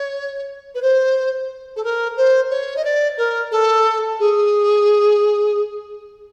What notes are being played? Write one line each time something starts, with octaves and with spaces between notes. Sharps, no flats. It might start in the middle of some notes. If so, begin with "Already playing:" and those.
Already playing: C#5
B4
C5
A4
A#4
C5
C#5
D#5
D5
A#4
A4
G#4